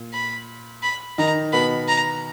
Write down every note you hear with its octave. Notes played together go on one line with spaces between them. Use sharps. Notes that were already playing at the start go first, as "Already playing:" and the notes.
Already playing: A#2
B5
B5
D#3 D#4 A#5
B2 B3 B5
A#5